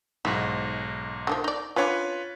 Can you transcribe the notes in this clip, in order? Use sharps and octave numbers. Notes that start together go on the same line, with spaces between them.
B1 G#2 E4 F#4
D3 D#3 F3
D#4 D5
C#4 D4 F4 B4 C#5